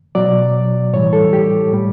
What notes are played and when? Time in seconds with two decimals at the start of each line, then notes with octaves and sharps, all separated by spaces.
0.15 B2 F#3 D5
0.93 A2 E3 G3 C#5
1.13 A4
1.33 G4
1.72 A2 G3